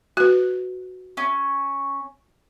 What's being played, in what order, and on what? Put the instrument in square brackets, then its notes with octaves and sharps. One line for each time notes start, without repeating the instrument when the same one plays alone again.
[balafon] F#4 B4 [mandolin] F#6
[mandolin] C#4